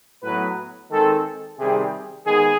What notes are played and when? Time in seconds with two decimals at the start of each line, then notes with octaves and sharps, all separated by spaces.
0.23 A2 F#3 B3 B4
0.91 D#3 G#3 C4 A4
1.59 C3 D#3 G3 C4 G#4
2.26 D#3 G#3 B3 G#4